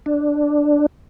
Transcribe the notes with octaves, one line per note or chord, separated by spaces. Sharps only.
D4